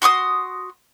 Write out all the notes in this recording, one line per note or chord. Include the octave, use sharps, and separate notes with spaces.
F#4 C6 C#6 D#6